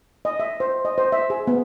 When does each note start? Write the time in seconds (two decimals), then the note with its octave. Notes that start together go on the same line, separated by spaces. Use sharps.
0.25 D#5
0.40 E5
0.60 C5
0.85 D#5
0.98 C5
1.12 E5
1.30 G#4
1.47 B3